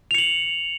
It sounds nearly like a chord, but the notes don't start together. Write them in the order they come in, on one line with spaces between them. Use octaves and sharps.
F7 C#7 F#7